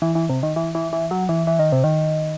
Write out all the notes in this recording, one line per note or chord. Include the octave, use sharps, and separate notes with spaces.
E3
E3
C3
D#3
E3
E3
E3
F#3
E3
E3
D#3
C3
D#3